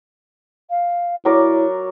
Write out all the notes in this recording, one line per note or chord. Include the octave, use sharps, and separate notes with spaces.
F5
F#3 E4 A#4 D5